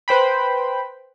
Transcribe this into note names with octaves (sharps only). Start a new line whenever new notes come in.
B4 C5 G5 B5